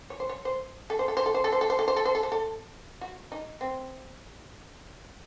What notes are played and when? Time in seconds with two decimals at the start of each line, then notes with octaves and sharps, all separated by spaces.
0.10 C#5
0.20 C5
0.29 C#5
0.45 C5
0.90 A4
0.99 C5
1.08 A4
1.17 C5
1.26 A4
1.34 C5
1.44 A4
1.52 C5
1.61 A4
1.70 C5
1.79 A4
1.88 C5
1.96 A4
2.05 C5
2.15 A4
2.23 C5
2.32 A4
3.01 F#4
3.32 D#4
3.61 C4